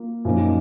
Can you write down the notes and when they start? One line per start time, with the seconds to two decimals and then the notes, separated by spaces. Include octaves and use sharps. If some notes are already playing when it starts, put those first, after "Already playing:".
Already playing: A#3 F4
0.25 F#2 F3 A#3 D#4